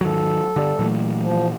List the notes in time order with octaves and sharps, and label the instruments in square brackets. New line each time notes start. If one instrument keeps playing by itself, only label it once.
[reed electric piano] E2 G#2 [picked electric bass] D#3 F#3 [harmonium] A4
[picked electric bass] G2 D3 [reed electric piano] G3 G4 D5
[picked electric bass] A#2 E3 [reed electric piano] F#3 A3
[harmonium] F3